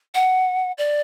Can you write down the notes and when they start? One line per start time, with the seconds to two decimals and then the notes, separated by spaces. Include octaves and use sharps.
0.14 F#5
0.78 D5